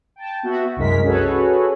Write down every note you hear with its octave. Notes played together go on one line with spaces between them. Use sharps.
G5 A5
B3 F#4 E5
C2 F#2 G#3 A#4 B6
C#4 F#4 G#4 A4 B4 C#5